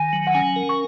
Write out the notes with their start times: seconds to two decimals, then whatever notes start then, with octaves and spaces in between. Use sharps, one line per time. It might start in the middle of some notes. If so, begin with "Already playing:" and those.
Already playing: D#3 G#5
0.13 F#3
0.27 F#5
0.34 C#4 G#5
0.56 A#4
0.69 C#6